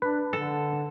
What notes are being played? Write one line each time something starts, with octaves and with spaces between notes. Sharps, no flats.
D4 B4
D3 A4